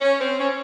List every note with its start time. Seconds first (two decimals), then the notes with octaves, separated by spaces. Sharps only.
0.01 C#4
0.20 C4
0.39 C#4